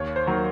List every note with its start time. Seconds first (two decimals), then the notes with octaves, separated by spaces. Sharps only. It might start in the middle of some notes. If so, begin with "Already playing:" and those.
Already playing: D#2 C#5
0.16 C5
0.27 D#3 F#3 A#3